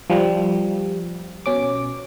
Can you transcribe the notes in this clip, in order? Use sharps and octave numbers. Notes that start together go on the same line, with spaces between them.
F3 G3
B2 C#4 D6